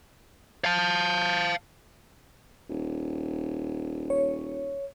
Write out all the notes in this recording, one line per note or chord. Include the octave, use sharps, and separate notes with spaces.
F5 A5
D#1
C#5